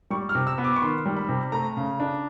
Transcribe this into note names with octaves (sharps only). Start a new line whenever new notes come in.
G3 C#6
F6
C3
E6
B3
D6
C#6
D#3 C6
G3
B5
C3
A3 A#5
C#3
D4